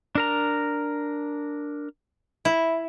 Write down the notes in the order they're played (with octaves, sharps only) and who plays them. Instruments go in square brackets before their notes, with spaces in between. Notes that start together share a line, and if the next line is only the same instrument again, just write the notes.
[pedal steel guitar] D4 A#4 A#5
[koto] E4